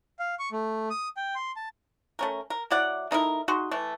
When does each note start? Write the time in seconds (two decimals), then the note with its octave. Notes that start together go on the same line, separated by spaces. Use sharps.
0.19 F5
0.39 C#6
0.52 A3
0.90 D#6
1.17 G5
1.35 C6
1.56 A5
2.19 A3 C#4 A#4
2.50 A#4
2.70 F#3 E4 D5 F#5
3.11 A3 D#4 E4 A#4
3.48 D#4 F#4 G#4 C6
3.71 E3 A3